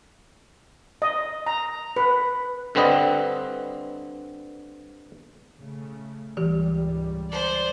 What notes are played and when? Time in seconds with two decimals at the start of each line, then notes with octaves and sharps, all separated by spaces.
1.02 D#5
1.47 A#5
1.96 B4
2.75 G2 D3 C4 B4 D#5
5.56 C#3 A3
6.37 C#2 G#2 E3 G3 G4
7.30 C5 D5